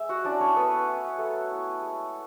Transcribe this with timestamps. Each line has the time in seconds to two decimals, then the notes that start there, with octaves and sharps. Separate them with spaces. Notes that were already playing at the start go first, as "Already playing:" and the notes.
Already playing: G#3 E5
0.09 F#4 F#5
0.24 C#4 D4 E4 D5
0.40 C#4 C#5
0.56 A3 B3 B4
0.87 C#4 E4
1.18 F#3 A3 A4
1.50 B3 E4
1.82 G#3